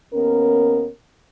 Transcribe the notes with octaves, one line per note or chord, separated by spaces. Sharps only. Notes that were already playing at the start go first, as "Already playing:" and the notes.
D#2 B3 C#4 A#4